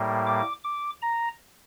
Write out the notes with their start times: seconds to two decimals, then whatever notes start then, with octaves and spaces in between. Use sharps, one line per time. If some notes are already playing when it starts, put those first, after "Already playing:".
Already playing: A2 G3 A#3
0.27 D6
0.64 D6
1.02 A#5